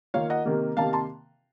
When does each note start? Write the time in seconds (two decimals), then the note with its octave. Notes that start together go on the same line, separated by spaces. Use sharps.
0.14 D#3 A#3 F4 C#5 F5
0.30 D#5 F#5
0.45 C3 D#3 A#3
0.77 C3 D#3 A#3 F5 A5
0.93 A5 C6